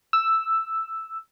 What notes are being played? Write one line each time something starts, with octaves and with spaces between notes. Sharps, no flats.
E6